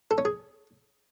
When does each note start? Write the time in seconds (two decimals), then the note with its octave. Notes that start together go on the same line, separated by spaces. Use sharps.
0.11 A4
0.18 C#4
0.25 G#4